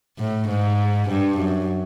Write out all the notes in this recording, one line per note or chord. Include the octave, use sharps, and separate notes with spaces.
A2
G#2
G2
F#2